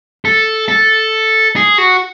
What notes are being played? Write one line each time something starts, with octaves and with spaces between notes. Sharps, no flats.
A4
A4
G#4
F#4